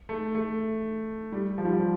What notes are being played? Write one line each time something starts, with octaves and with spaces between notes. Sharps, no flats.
A3
A3
G3
F3
G3
F3